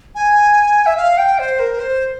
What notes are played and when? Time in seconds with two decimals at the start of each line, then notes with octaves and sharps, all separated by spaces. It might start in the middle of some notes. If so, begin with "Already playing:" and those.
0.15 G#5
0.86 E5
0.97 F5
1.18 G5
1.39 C5
1.59 A#4
1.79 C5